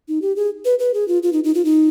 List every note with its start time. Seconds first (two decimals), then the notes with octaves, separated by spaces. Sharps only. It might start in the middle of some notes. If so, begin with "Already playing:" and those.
0.08 D#4
0.22 G4
0.36 G#4
0.65 B4
0.79 B4
0.94 G#4
1.08 F4
1.23 F4
1.33 D#4
1.44 D#4
1.55 F4
1.65 D#4